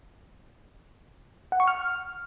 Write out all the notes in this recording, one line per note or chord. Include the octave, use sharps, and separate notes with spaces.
F#5
C#6
F6